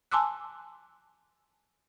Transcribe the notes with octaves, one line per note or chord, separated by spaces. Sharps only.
G#5 A5 C6 D6 E6 F#6